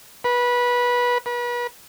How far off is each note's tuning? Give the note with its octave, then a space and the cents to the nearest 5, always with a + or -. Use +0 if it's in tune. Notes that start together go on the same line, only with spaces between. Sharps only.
B4 -20
B4 -35